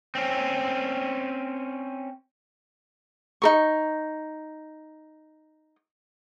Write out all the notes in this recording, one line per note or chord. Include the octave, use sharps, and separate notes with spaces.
C4 C#4
D#4 A#4 C#6